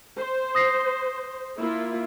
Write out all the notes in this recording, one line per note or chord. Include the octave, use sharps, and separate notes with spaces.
C5
D#6 A#6 C7
A#3 E4 F4